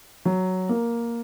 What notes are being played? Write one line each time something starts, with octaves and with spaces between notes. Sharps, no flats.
F#3
A#3